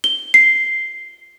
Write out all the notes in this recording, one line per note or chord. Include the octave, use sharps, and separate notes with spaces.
G7
C7